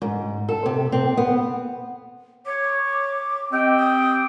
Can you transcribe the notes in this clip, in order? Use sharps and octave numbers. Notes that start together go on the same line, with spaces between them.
G#2
A4
C3
C4
B3
C#5 D6
C4 G4 D#5 G5
D#6